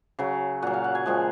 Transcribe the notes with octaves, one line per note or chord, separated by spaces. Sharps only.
C#3 F#3
A#2 F#3 F#5
F5
F#5
G#5
A#2 F3 G#3 F#5